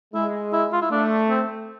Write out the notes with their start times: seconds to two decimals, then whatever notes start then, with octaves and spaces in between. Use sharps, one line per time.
0.14 G#3 E4
0.53 E4
0.73 F4
0.82 E4
0.91 A3 D4
1.29 C4